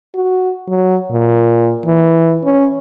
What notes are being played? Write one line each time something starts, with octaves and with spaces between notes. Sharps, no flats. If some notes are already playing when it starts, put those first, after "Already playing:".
F#4
F#3
A#2
E3
C#4